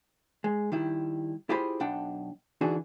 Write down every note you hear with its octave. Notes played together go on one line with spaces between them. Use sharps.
G#3
D#3 G3 E4
E4 F4 G4 G#4 C5 B5
B1 B2 D4 F#5 G5
D3 E3 D4 D#4 F#4 G#4